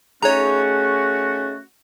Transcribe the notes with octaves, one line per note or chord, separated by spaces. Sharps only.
A3 C#4 D#4 F#4 G#4 C#5 A#5